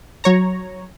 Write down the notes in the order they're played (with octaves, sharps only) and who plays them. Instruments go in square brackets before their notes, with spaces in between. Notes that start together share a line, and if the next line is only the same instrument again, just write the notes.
[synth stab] F#3 C#5 A#5